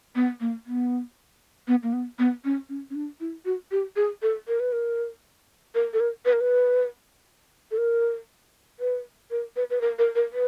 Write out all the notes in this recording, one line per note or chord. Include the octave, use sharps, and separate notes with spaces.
B3
A#3
B3
B3
A#3
B3
B3
C#4
C#4
C#4
D4
E4
F#4
G4
G#4
A4
A#4
B4
A#4
A#4
A4
A#4
B4
A#4
B4
A4
A#4
B4
A#4
B4
B4
A#4
A#4
A#4
B4